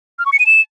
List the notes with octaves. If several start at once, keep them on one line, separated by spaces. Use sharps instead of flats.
F6
C#6
C#7
D#7
E7